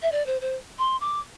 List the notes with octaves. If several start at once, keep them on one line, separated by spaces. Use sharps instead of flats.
E5
D5
C5
C5
C6
D6